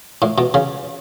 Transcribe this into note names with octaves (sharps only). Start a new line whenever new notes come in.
A2
B2
C#3